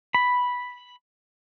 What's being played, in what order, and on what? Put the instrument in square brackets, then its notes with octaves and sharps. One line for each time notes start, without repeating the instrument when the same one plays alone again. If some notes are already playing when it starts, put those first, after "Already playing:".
[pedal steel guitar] B5